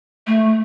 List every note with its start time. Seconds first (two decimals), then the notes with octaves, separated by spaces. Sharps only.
0.27 A3